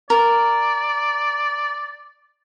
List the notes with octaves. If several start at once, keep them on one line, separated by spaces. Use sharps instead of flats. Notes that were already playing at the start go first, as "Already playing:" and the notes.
A#4 D5